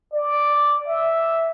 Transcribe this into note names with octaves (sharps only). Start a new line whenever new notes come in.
D5
E5